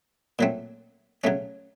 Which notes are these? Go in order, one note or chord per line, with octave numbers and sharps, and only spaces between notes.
A#2 F#3 A3 C4
C#3 F#3 A3 C#4